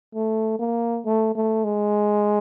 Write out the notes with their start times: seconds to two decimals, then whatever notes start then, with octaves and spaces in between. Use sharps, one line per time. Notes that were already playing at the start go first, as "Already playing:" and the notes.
0.15 A3
0.59 A#3
1.05 A3
1.35 A3
1.64 G#3